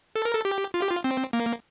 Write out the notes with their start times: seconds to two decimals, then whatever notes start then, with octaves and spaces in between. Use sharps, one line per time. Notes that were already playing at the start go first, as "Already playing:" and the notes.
0.16 A4
0.25 A#4
0.34 A4
0.45 G4
0.74 F4
0.82 G4
0.90 F4
1.04 C4
1.33 A#3